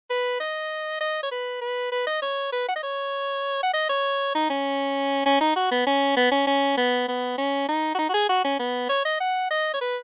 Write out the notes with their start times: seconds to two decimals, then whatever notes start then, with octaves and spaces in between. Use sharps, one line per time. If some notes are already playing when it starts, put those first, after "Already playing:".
0.10 B4
0.40 D#5
1.01 D#5
1.23 C#5
1.32 B4
1.62 B4
1.92 B4
2.07 D#5
2.22 C#5
2.53 B4
2.69 F#5
2.76 D#5
2.83 C#5
3.63 F#5
3.74 D#5
3.89 C#5
4.35 D#4
4.50 C#4
5.26 C#4
5.41 D#4
5.56 F#4
5.72 B3
5.87 C#4
6.17 B3
6.32 C#4
6.47 C#4
6.78 B3
7.08 B3
7.38 C#4
7.69 D#4
7.95 F#4
7.99 D#4
8.09 F#4
8.14 G#4
8.29 F#4
8.45 C#4
8.59 B3
8.90 C#5
9.05 D#5
9.21 F#5
9.51 D#5
9.74 C#5
9.81 B4